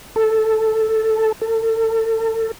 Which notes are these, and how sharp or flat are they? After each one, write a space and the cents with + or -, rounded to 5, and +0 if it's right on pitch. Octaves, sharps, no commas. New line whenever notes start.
A4 +0
A4 +35